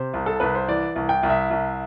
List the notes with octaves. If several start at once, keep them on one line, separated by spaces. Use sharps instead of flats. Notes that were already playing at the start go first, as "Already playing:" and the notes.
Already playing: C3 C5
C2
A4
C2 B4
C5
E3 D5
C2
G5
C2
E5
C2